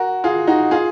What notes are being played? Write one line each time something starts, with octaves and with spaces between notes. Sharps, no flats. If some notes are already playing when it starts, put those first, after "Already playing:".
Already playing: F#4 A#4
F4 G#4
D#4 F#4
F4 G#4